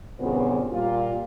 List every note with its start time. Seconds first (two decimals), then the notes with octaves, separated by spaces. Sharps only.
0.20 E2 G2 A#2 C#3 B3 C4
0.72 A#2 G3 F4